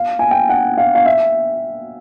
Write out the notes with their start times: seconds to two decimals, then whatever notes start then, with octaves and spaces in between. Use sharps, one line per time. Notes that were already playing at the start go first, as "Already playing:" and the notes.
Already playing: F5
0.19 G#5
0.31 G5
0.49 F#5
0.77 F5
0.95 F5
1.06 E5